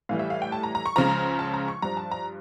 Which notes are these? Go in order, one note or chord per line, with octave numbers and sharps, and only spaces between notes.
A2 E3 G3 F5
E5
F5
G5
A5
A#5
A#5
C#6
C#2 C#3 F3 A#5
A5
A#5
C#6
G2 F3 A#5
A5
A#5